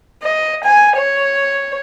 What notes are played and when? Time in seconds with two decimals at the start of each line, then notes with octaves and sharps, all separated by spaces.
0.22 D#5
0.64 G#5
0.97 C#5